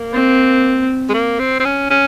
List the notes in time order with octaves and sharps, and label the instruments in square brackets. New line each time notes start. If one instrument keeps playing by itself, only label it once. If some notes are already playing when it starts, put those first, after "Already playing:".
Already playing: [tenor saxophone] A#3
[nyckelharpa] C4
[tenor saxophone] G#3
A#3
C4
C4
C#4
C#4